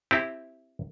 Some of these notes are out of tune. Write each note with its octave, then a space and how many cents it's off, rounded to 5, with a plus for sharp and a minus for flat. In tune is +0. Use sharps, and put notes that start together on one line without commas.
C4 +0 E4 +0 G4 +0